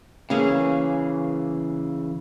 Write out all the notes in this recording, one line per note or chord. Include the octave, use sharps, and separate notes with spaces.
C#3 E3 A#3 C#4 G#4